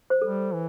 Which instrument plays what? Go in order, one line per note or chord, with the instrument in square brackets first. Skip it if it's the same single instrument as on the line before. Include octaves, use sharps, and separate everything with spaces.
[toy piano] C5
[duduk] G3 [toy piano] A4
[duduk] E3